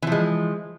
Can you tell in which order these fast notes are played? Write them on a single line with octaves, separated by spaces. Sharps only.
E3 F3 G#3